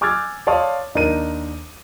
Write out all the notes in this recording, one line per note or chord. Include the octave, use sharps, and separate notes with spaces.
G#5 D6 E6 F6 G#6 A6
C#5 D5 F5 A5 C6 D#6
D#2 D4 D#4 A#4 D#7